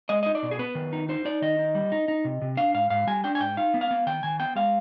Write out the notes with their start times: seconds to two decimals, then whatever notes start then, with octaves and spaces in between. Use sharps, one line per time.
0.09 G#3 D#5
0.23 D#4 D#5
0.35 D5
0.43 B2
0.51 G#4
0.59 B3 B4
0.75 D#3
0.93 D#4
1.09 D#4 C5
1.25 D#4 D5
1.42 D#3 D#5
1.59 D#4
1.75 G3
1.92 D#4
2.08 D#4
2.25 C3
2.42 C3
2.57 D4 F5
2.74 G#2 F5
2.90 G#2 F5
3.07 G3 G#5
3.24 D4 G5
3.35 G#5
3.40 G#2 G5
3.57 D#4 F5
3.74 B3
3.81 F5
3.91 B3
4.07 D#3 G5
4.23 D#3 G#5
4.40 B3 G5
4.56 G#3 F5